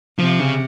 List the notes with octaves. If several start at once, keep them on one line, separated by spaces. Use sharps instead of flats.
C3 F3
C#3